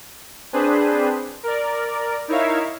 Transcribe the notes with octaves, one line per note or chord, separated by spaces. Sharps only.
C4 D4 G#4 B4 C5
A#4 D5
D#4 E4 A#4 C#5 E5 F5